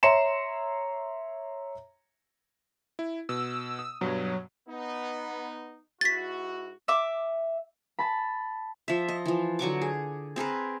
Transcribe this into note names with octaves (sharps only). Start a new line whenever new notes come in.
C#5 E5 A#5 C6 C#7 E7
E4
B2 E6
D#6
G2 B2 F#3
B3 D#4
G#2 E4 F#4 A6 B6
E5 D6
A5 B5
F3 E5
D#5
E3 F3
D3 F#3 C#6 D6
G#4
C4 G#4 A#4 B4